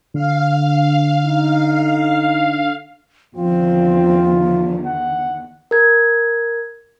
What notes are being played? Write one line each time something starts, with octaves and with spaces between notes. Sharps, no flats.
D3 F5
D#4
E2 D3 D#3 F3 C4 F4
F#5
A#4 G#6